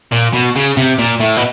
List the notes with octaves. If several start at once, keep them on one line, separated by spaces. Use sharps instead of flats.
A#2
B2
C#3
C3
A#2
A2
B2